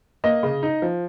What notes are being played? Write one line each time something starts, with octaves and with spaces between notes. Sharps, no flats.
A#3 D#5
C#3
D#4
F3